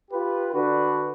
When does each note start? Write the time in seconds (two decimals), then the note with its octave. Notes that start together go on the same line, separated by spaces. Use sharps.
0.11 F4 G4 B4
0.53 D3 D4 F#4 B4